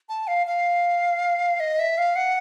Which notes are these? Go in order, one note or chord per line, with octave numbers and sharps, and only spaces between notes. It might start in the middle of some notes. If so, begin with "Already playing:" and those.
A5
F5
F5
D#5
E5
F5
F#5